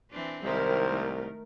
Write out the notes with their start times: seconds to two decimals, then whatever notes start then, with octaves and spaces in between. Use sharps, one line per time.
0.11 E3 C4 D4
0.44 C2 D#3 G#3 E4 A#4 C5
0.86 A3